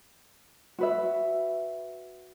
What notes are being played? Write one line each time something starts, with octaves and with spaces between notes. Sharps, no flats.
F#4 B4 E5